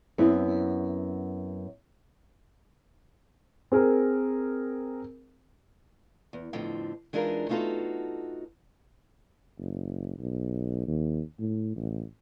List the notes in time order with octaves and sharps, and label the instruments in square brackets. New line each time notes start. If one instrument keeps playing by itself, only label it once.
[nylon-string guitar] F#2 B3 C4 E4
[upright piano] C4 G#4 A#4
[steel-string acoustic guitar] E2
F2 A2 D3 F3 C4
E3 G#3 D4 D#4 F4 A#4
A3 B3 D#4 F4 F#4 A4
[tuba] F#1
B1
D#2
A2
A1